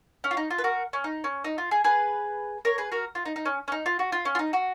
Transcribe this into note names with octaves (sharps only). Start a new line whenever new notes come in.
C#4
F4
D#4
F4
B4
F#4 A#4
C#4
D#4
C#4
D#4
F4
G#4
G#4 B4
A#4 C#5
G#4 B4
F#4 A#4
F4
D#4
D#4
C#4
C#4
D#4
F4
F#4
F4
C#4
F4
D#4
F#4